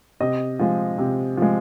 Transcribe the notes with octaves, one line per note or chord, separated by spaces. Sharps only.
C3 D#5
F3 G#3
C3
F3 G#3